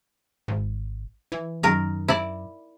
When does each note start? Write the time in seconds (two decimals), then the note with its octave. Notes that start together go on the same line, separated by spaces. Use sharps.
0.48 G#1
1.32 E3
1.63 F#2 D#3 A#4
2.08 E4 D5